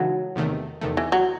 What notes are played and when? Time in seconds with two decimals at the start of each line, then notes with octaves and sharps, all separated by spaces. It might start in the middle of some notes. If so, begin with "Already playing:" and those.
Already playing: C#3 E3 F#3 G#3 D#4 A4
0.35 E2 C3 D#3 A3
0.81 E2 C3 D#3 A3
0.97 E3
1.12 F#3